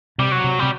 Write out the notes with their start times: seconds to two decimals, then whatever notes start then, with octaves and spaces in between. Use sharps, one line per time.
0.18 C3 G3
0.32 F#3
0.44 C3
0.59 C3 G3